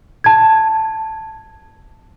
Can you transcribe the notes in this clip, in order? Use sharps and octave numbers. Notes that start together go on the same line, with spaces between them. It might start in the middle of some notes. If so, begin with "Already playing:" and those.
A5 G#6